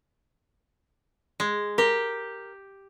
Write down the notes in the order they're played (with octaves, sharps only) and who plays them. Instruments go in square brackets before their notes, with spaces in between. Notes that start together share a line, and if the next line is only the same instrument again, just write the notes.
[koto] G#3
[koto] G4 [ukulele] A#4